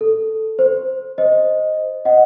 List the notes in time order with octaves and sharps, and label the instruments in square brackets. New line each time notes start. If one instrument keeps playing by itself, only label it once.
[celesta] A4
C5
C5 D#5
D#5 F#5